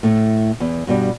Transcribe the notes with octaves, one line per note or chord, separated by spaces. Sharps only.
A2 A3
E2
G2 B2 G3